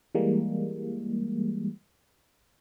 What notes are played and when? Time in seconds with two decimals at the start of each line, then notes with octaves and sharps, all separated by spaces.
0.15 E3 G3 G#3 A#3